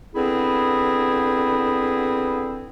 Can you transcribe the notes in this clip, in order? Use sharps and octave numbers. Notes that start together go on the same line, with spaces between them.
D3 B3 C4 E4 G#4